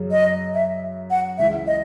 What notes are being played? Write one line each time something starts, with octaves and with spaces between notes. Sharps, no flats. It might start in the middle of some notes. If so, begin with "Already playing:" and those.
Already playing: F#2 C#3 F#3
D#5
E5
F#5
C#2 C#3 E3 E5
D#5